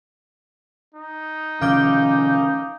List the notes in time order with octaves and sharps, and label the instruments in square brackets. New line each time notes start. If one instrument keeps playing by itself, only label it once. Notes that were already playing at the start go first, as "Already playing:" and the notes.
[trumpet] D#4
[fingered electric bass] C3 D#3 F3 [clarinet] C#4 [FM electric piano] F5 D6 G6